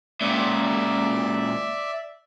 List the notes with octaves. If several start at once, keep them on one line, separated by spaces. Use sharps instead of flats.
C#2 A#2 D5 E5